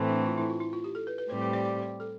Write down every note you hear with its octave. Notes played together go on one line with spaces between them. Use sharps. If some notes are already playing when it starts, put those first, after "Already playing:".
Already playing: A2 E3 A3 C4
D4
F4
E4
F4
E4
F4
G4
A4
B4
B4
A2 G3 C4 G4 C5
B4
D5
D5
C5
A4